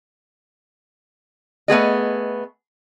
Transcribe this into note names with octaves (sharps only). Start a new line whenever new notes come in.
A3 B3 G#4 D#5